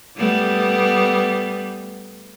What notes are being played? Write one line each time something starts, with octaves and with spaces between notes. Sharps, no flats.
G3 A3 B3